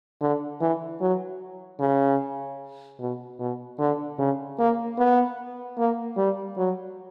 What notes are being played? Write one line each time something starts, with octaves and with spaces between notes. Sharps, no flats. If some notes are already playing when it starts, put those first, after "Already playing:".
D3
E3
F#3
C#3
B2
B2
D3
C#3
A#3
B3
A#3
G3
F#3